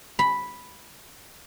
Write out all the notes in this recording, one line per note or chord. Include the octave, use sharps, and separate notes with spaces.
B5